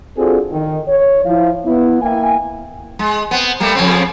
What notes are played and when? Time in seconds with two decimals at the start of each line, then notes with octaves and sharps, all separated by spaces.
0.17 C4 D4 F4 F#4 G#4 A4
0.52 D#3
0.88 C#5
1.25 F3 E4 F5
1.66 B3 E4
2.02 A#3 E4 G5 G#5
2.99 G#3
3.31 B3 C4
3.60 G3 A3 A#3
3.75 F2 C#3 C4